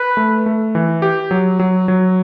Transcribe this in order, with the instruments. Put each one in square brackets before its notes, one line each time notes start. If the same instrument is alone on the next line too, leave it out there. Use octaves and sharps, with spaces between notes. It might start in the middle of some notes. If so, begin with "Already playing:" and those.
Already playing: [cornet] B4
[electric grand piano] A3
A3
E3
G4
F#3
F#3
F#3